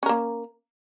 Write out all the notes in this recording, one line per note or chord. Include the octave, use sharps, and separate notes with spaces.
A#3 C#4 A#4